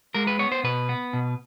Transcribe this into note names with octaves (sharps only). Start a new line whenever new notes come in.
G#3 A#4
B4
B3 C#5
C5
B2 B4
B3
B2